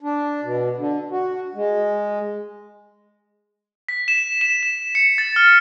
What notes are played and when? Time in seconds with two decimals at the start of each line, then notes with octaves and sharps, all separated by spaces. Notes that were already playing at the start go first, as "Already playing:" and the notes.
0.01 D4
0.43 B2
0.77 D3
1.11 F#4
1.55 G#3
3.89 B6
4.08 E7
4.41 E7
4.63 E7
4.95 C#7
5.18 A6
5.36 F6